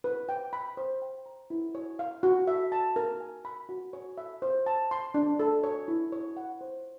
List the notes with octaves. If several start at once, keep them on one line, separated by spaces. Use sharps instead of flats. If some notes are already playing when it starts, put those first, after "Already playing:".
B4
G5
B5
C5
G5
A#5
E4
C#5
F5
F#4
E5
A5
A#4
G#5
B5
F#4
C#5
E5
C5
A5
C6
D4
A4
C#5
E4
C#5
F#5
C5